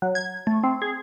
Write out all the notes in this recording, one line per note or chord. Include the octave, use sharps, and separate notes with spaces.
F#3
G#6
A3
C4
G#4